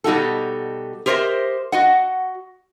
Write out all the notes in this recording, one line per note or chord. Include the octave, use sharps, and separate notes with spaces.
B2 G3 D#4 F#4 G4 A4
G4 A#4 C5 C#5 D#5 E5
F#4 D#5 F#5